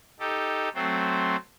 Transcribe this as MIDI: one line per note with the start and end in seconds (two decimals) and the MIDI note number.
0.20 0.69 63
0.20 0.69 67
0.20 0.69 69
0.75 1.36 54
0.75 1.36 57
0.75 1.36 60
0.75 1.36 72